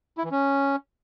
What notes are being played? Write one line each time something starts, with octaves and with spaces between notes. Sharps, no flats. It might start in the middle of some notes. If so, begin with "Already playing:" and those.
E4
E3
C#4